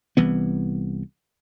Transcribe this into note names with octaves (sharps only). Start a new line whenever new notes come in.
C2 E3 B3